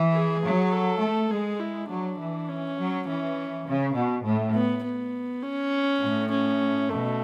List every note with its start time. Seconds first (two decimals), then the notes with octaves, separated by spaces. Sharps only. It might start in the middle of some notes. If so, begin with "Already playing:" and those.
Already playing: E3
0.13 G#4
0.42 F#3
0.72 A4
1.01 A3
1.31 G#3 G#4
1.60 E4
1.89 F#3 D4
2.19 E3
2.49 C#4
2.78 F#3
3.07 E3 C#4
3.66 C#3
3.95 B2
4.25 A2
4.54 B3
4.84 B3
5.43 C#4
6.02 A2
6.31 C#4
6.89 B2 A3